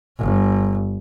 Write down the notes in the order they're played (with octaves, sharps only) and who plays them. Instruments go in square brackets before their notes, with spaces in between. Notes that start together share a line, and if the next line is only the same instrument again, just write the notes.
[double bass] G1